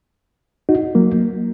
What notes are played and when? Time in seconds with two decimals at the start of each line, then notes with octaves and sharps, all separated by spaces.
0.69 D#4 F#4
0.95 F#3 A#3